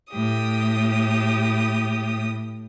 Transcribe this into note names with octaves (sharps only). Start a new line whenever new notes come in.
A2 G4 D#6